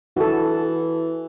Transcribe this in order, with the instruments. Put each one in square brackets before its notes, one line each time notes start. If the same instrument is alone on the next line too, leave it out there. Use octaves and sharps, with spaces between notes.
[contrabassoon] E3 [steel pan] F#4 A4